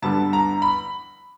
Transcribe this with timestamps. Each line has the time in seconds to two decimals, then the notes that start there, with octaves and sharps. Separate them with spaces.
0.02 G2 D3 G3 B3 A5
0.33 A#5
0.62 B5